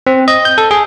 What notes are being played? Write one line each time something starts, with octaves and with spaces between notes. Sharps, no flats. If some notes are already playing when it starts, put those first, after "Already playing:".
C4
D#5
G6
A4
G#4